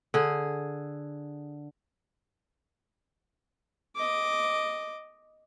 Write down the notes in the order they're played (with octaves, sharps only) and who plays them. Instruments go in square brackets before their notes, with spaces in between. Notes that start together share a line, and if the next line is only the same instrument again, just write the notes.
[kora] D3 G#4
[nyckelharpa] D#5 D6